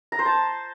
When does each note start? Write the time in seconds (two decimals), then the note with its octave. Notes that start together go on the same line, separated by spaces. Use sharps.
0.12 A#5
0.19 C5
0.26 A5